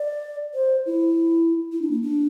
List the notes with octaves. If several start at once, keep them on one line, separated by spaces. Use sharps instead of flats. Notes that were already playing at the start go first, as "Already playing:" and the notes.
Already playing: D5
C5
E4
E4
D4
A#3
D4